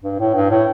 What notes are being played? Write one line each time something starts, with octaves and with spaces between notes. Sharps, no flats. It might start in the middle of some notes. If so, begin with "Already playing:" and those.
G2
A2
G2
A2